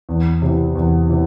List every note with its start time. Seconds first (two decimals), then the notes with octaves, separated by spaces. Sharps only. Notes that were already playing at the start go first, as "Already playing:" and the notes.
0.09 E2
0.42 C3 E3
0.75 E2
1.10 C3 E3